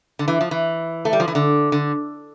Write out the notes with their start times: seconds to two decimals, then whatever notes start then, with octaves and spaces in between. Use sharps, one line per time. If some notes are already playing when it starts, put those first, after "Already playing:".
0.19 D3
0.28 E3
0.41 F3
0.51 E3
1.05 A3
1.13 G3
1.20 F3
1.28 E3
1.35 D3
1.72 D3